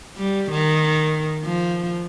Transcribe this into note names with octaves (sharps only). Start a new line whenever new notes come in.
G3
D#3
F3